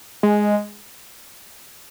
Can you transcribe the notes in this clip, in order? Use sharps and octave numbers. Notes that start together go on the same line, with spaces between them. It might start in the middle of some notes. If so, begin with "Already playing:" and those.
G#3